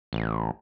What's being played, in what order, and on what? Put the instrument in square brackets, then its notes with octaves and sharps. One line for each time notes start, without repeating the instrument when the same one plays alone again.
[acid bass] A1